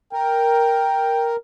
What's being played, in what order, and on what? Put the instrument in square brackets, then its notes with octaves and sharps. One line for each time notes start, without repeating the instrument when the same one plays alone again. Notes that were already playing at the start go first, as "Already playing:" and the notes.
[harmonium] A#4 [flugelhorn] G5